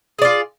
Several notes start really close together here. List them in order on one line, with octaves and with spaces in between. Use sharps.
G#4 D5 F4